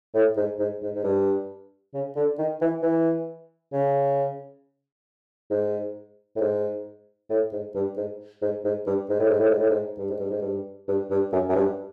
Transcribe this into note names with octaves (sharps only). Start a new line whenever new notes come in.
A2
G#2
G#2
G#2
G#2
G2
C#3
D3
D#3
E3
E3
C#3
G#2
A2
G#2
A2
G#2
G2
G#2
G#2
G#2
G2
G#2
A2
G#2
A2
G#2
A2
G#2
G2
G#2
G2
G#2
G2
G2
G2
F#2
F#2
G2